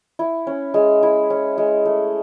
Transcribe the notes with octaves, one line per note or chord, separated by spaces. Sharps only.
E4
C#4
G#3
E4
C#4
G#3
A3